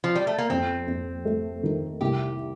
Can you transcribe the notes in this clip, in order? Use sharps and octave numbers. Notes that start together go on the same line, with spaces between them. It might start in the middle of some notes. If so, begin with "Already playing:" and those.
F3
G3
A3
A#3
F2 C4
F2
A3
D#3
C2 G4